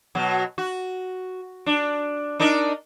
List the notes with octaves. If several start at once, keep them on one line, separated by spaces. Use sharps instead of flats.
B2 F#3
F#4
D4
D4 D#4 A#4